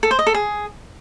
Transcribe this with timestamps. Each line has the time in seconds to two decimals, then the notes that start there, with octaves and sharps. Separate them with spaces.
0.03 A4
0.11 C5
0.19 D#5
0.27 A4
0.34 G#4